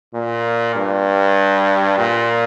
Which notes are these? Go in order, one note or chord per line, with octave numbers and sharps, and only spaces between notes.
A#2
G2
A#2